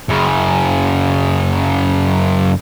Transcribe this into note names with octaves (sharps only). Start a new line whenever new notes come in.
F#2 C#3